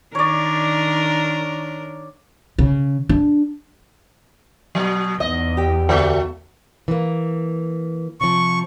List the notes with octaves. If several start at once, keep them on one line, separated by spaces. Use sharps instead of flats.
D#3 D4 A#4 C#5 D5
C#3
D4
B2 F#3
E2 G#2 D#5
G4 G5
D2 A3 F#4
E3 A#3
C3 F3 C#6